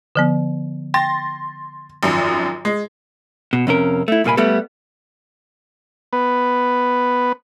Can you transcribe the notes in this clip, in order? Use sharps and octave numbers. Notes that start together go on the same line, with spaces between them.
D3 F3 B3
G5 C6 A6 A#6
G#1 F#2 F3
G#3
B2
F2 C3 C#4 A#4
A3 E4
C2 A#2 A#3 G#5 B5
G3 A3 B3 A4
B3